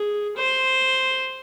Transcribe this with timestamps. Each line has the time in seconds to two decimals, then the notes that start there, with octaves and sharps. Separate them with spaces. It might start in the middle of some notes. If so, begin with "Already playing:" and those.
Already playing: G#4
0.37 C5